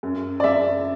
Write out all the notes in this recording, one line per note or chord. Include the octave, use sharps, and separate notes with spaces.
F#2
D5
F#2 E5